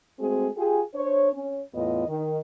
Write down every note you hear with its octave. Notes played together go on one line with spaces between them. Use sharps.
G#3 A3 C4 F#4 G#4
F4 G4 G#4
D4 C5 C#5
C#4
E2 A2 B3 F4 D#5
D#3